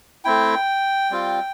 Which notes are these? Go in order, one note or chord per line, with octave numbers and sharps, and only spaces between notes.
A3 C4 E4 G5
G3 C4 F4